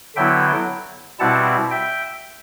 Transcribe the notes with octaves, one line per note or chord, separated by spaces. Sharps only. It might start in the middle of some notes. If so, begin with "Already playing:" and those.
D3 F#3 B3 E4 E5 G5
B2 G3 C4 E4 F#5 A5
E5 G5